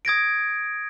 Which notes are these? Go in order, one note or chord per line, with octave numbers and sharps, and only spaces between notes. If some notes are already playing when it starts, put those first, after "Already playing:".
D#6 G#6 A#6 D7